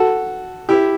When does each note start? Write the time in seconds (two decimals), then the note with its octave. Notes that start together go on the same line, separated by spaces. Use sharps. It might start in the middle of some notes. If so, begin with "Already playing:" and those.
Already playing: F#4 A4
0.69 E4 G4